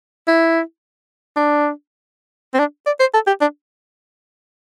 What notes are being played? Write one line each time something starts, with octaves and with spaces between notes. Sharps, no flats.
E4
D4
C4
D4
D5
C5
A4
G4
D4